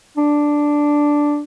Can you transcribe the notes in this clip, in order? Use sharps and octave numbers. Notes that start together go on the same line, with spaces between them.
D4